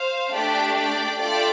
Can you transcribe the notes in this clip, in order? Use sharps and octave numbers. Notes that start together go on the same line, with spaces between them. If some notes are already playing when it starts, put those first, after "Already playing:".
Already playing: C5 F5
A3 D4 G4 D5 G5
D5 G5
A3 F4 A4 D5 G5